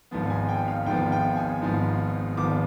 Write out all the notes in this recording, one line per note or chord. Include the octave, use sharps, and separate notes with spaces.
G#1 G#2 F3 B3
G#5
G5
F5
G#1 G#2 F3 B3 G5
G5
G#5
G#1 G#2 F3 B3
G#1 G#2 F3 B3 D6